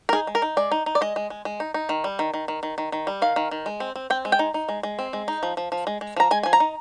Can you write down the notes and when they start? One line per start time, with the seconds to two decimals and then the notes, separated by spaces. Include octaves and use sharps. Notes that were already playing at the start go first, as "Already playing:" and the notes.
0.09 A#4
0.13 D#4 G#4
0.27 G#3
0.35 A#4
0.42 D#4
0.57 G#3 D5
0.71 D#4
0.86 D#4
0.95 D5
1.01 G#3 D#5
1.16 G#3
1.30 G#3
1.45 G#3
1.60 D#4
1.74 D#4
1.89 D#3
2.04 G3
2.19 D#3
2.34 D#3
2.48 D#3
2.63 D#3
2.78 D#3
2.92 D#3
3.07 G3
3.22 D#3 F5
3.36 D#3
3.51 D#3
3.66 G#3
3.80 C4
3.96 C4
4.10 C4 G5
4.25 G#3
4.32 G5
4.39 D#4
4.54 D#4
4.69 G#3
4.83 G#3
4.99 C4
5.13 G#3
5.28 D#4
5.43 F3
5.57 F3
5.72 F3
5.87 G#3
6.01 G#3
6.16 F3 A#5
6.31 G#3 G#5
6.43 F3 G#5
6.53 A#5
6.60 D#4